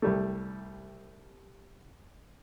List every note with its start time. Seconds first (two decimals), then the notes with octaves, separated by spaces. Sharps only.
0.02 C2 G3 A3